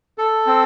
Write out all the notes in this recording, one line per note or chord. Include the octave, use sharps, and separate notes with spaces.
A4
C4